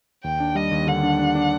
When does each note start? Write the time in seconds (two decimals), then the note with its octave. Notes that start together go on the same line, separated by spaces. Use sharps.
0.24 D#2 G5
0.40 D4
0.55 G3 D#5
0.71 D#2
0.87 D3 F#5
1.03 D4
1.19 D4
1.35 D4